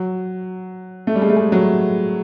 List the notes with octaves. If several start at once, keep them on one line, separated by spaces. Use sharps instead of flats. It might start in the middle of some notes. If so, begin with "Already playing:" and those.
Already playing: F#3
A3
G3
G#3
A3
G#3
F#3